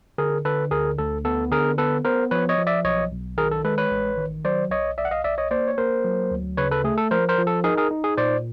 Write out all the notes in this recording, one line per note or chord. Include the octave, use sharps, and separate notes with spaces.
D3 G#4 A#4
D3 A4 B4
D2 G#4 A#4
D2 A4
B3 A4
D3 G#4 A#4
B3 A4 B4
B3 A#4 C5
F3 B4 C#5
C#5 D#5
F3
D5 E5
B1 C#5 D#5
B1
D#3 G#4 A#4
A4
G#3 A4 B4
B4 C#5
A1
D#3
F#3 C5 D5
B1 C#5 D#5
B1 D5 E5
F#5
D#5 F5
B1 D5 E5
C#5 D#5
A#3 C5 D5
C#5
A#3 A#4 C5
F#3
D2
C#3 B4 C#5
A4 B4
A3 G#4
A4
F3 A#4 C5
A#4 C5
F3
A4
D#4 G#4 A#4
G#4 A#4
D#4
G#4
A#2 C5 D5